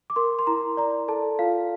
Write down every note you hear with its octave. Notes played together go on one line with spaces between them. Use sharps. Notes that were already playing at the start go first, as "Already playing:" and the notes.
D6
A#4 C6
C6
E4 A#5
D5 A#5
A4 A5
F4 F5